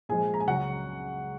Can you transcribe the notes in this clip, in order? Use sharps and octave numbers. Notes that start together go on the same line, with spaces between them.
A#2 F3 G#3 G#4 G#5
A#5
G#5
C#2 C#3 F#3 F#4 F#5